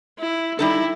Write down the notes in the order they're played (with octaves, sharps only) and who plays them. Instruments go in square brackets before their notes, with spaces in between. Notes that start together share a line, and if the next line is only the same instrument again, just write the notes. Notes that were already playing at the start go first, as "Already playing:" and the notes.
[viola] E4
[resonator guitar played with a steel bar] G3 D#4 A4 [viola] E4